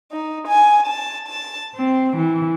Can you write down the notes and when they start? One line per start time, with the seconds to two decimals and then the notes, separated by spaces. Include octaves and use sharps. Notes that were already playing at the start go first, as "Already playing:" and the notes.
0.12 D#4
0.47 G#5
0.86 A5
1.28 A5
1.75 C4
2.17 E3